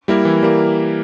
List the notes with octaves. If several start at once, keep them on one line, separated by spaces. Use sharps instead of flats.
G3 A#3 E4 A#4
E3
G3 A#3